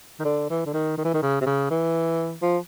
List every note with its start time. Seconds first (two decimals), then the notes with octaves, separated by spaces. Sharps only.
0.20 D#3
0.25 D3
0.50 E3
0.66 D3
0.74 D#3
0.98 D#3
1.05 E3
1.14 D#3
1.22 C#3
1.41 C3
1.46 C#3
1.71 E3
2.42 F3